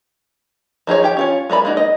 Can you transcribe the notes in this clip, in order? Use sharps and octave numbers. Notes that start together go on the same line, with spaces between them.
F3 D#4 G#4 C#5
G4 G5
C#4 F4 C#5
G#3 A#4 D5 B5
G#3 A#3 D#4 F#4
D#5